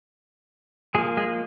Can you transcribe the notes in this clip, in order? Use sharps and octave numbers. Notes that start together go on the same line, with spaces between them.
F3 G#3 A#3 G#4
G#3 G#4